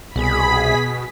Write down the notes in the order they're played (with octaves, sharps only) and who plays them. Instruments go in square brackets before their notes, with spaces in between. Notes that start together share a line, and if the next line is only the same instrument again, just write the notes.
[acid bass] C2 [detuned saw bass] B2 [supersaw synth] G#4 B6 [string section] B5